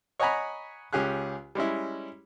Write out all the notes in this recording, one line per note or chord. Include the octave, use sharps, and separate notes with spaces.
C#5 D#5 F#5 G#5 A#5 B5
C#2 C#4 G4 G#4 F#6
G3 G#3 C#4 E4